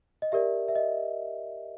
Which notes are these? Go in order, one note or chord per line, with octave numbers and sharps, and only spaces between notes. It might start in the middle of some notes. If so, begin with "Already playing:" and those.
D#5
G4 A#4 D5 E5
E5
D#5